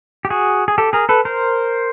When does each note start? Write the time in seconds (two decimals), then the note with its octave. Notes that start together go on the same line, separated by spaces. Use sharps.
0.25 G4
0.30 F#4 G#4
0.68 G#4
0.78 G4 A4
0.93 G#4 A#4
1.09 A4 B4
1.25 A#4 C5